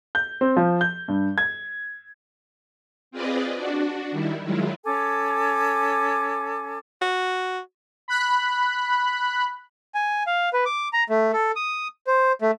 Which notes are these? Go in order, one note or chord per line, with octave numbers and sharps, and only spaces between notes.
G6
C4
F3
G6
G2
G#6
C4 F4 G#4 B4 D5 D#5
D4 F#4
D#3 G3 E4
D#3 F#3 G#3 E4 F4
C#4 A4 G#5 D6
F#4
B5 F#6
G#5
F5
B4
D6
A#5
A3
A4
D#6
C5
A3